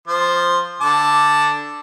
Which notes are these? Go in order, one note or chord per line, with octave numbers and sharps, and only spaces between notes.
F3 C5
D3 A5 D6